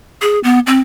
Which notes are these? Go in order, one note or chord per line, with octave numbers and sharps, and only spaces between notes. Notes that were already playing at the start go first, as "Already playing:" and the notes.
G#4
B3
C4